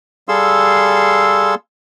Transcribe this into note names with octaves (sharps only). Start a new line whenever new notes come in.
G3 G#4 A4 F5 C6 E6